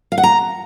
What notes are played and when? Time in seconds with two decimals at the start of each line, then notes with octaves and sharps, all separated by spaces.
0.12 F5
0.18 F#5
0.23 A#5